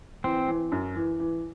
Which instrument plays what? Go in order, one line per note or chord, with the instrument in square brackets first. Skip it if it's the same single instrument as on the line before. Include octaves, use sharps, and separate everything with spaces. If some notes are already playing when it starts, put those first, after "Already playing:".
[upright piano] E3 [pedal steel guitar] C4
[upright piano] E3
F#2
E3
E3